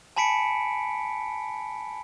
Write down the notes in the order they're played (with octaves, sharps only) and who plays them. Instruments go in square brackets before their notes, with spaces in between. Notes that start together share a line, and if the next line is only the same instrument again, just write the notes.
[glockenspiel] G#5 A5 B5 B6 C#7 D7